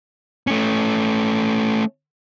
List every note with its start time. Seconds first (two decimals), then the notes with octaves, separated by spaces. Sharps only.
0.47 A3 C#4